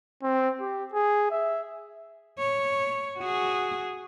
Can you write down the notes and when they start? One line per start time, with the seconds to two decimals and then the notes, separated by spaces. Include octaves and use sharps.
0.23 C4
0.60 G4
0.94 G#4
1.31 E5
2.39 C#5
3.18 F#4 G#4